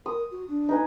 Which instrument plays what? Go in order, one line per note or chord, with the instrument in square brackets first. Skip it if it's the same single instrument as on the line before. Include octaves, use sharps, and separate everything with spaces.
[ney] A#4 [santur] D#6
[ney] F#4
D4
[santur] D#4 B4 G#5